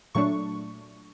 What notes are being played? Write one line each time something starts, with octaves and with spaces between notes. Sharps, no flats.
A#2 F#3 A3 D4 C#6